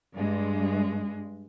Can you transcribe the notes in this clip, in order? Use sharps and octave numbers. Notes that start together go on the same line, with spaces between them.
G2 G#3